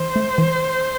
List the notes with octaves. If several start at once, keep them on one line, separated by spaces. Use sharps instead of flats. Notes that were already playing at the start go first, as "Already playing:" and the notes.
Already playing: E3 C5
A3
E3